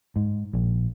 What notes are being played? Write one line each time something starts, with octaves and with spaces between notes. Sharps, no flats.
G#2
A#1